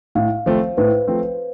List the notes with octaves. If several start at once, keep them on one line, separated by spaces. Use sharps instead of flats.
A2 F5
F3 A3 C4 C5
A2 B4
F3 A3 C4